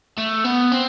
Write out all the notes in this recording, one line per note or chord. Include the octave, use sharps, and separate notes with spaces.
A3
B3
C4